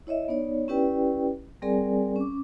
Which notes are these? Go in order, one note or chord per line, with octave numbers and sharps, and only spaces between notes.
E4 C#5 D#5 E5
B3 D#4 C#5 D5
C#4 E4 G4 B4 D5 G5
G3 C4 G#4 A#4 D5 G#5
C#4 D6